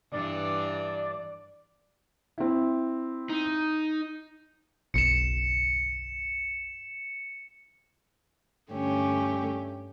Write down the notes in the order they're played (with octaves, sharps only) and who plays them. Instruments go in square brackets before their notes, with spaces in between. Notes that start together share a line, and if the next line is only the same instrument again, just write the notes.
[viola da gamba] G2 E3 D4 [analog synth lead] D5
[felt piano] C4 E4
[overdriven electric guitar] D#4
[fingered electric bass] F#1 B1 [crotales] C#7 E7
[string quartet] G2 D3 A3 C#4 G4